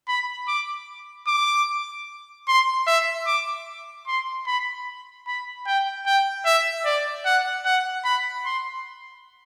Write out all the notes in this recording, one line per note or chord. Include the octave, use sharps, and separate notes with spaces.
B5
D6
D6
C6
E5
D6
C6
B5
B5
G5
G5
E5
D5
F#5
F#5
B5
C6